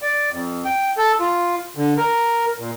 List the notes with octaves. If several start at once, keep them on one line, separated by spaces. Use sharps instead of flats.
D5
F2
G5
A4
F4
D3
A#4
A#2